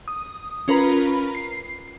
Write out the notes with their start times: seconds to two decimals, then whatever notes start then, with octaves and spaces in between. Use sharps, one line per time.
0.08 D#6
0.68 C#4 F4 A#4 B4 A#5 B5
1.35 C7